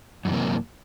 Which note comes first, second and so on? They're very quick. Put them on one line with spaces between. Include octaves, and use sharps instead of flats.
F#2 E3 C3 A#3